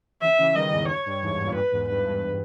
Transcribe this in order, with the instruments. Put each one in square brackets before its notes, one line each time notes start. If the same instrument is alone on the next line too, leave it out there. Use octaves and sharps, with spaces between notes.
[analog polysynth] C#3 E3 [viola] E5
[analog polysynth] C#3 E3
[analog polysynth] D#3 G3 [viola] D#5
[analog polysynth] E2 G#2
[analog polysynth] G2 [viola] C#5
[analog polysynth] G2
E2 G#2
E2 G#2
G2 A#2
[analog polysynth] G2 A#2 [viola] B4
[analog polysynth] E2 G#2
[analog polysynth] G2 [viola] B4
[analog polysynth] G2